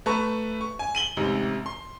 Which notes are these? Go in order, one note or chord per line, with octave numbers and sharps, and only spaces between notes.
A3 B4 A5 A#5 C#6
C#6
G#5
D#7 F#7 G7
A1 G#2 C3
C6